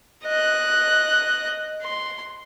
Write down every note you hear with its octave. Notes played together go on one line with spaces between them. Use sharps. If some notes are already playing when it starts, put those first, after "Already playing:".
D#5 F#6
C6